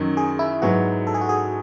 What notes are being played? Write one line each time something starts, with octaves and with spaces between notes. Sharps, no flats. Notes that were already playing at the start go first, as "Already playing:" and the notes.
Already playing: F#2 D#3 F#3
G#4
E4
G#2 F#3 B3 E4 F#4
A4
G#4
F#4
G#4